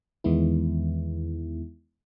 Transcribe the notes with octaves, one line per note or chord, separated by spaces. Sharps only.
E2 D#3 E3 G#3 B3 E4